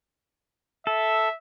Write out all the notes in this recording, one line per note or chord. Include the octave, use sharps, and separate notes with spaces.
A4 E5